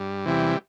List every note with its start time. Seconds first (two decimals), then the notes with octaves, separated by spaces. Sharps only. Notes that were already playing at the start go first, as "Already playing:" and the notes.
Already playing: G2
0.25 E2 C3 E3 G3